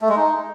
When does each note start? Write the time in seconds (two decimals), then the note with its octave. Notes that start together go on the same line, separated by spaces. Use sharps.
0.02 A3
0.09 G#3
0.16 D#4